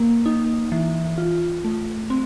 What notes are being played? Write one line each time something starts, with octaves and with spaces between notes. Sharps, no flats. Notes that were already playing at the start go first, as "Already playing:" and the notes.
Already playing: A#3
D#4
E3
F4
A3
C4